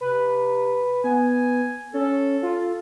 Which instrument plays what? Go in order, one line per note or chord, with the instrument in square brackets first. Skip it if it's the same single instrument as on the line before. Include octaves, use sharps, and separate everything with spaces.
[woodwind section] C3 [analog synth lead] B4
[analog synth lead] B3 [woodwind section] G#5
[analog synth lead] C#4 [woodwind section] A4
[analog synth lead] F4